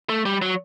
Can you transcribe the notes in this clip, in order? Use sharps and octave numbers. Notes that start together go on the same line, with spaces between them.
A3
G3
F#3